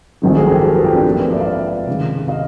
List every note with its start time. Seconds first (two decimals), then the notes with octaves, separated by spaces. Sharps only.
0.22 A#1 G#2 D#3 F#3
0.30 A4
0.36 F#4 G#4
0.45 A#4
0.50 G4 A4
0.64 G#4 A#4
0.74 A4 B4
0.84 F4 G4
0.94 C4 D4
1.05 G#2 F3 A#3 A#4
1.19 A4 B4
1.32 D5 E5
1.40 F5
1.46 D5 E5
1.87 C#2 C3 D#3
2.28 D#5 F5